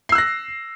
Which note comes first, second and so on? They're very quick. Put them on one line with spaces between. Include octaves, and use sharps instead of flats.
C7 E6 F#6 A#6